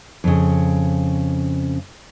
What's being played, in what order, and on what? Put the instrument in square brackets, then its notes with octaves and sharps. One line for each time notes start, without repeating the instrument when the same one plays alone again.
[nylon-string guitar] F2 C#3